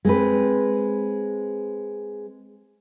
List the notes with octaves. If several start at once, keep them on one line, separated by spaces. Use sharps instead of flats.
G#3 C4 B4